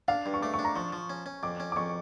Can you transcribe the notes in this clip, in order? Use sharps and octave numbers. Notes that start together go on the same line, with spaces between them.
D4 F5
G2
C#6
A3 D6
C#6
D4
A#5
F3 C#6
F3
C#4
C#4
F2 D6
C#4
D6
F2 C#6